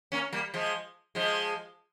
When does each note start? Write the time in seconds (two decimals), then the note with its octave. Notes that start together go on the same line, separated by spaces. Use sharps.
0.12 A#3 C#4
0.33 G3 A#3
0.54 F3 G#3
1.15 F3 G#3